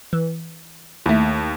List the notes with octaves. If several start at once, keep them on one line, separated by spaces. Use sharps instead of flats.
E3
D#2 A3 E4